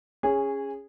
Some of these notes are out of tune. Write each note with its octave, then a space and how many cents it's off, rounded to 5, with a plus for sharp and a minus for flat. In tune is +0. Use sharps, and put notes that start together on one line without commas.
C#4 +0 G#4 -15